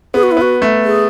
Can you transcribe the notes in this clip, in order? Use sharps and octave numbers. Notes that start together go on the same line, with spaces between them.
B3 G#4
F#4
E4
B3 F#4
A3
G#4